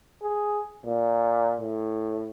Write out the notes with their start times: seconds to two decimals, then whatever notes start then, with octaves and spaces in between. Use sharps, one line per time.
0.22 G#4
0.86 A#2
1.61 A2